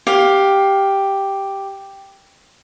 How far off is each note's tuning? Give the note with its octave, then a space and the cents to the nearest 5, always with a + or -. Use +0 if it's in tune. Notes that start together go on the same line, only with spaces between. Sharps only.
G4 +0 F5 +15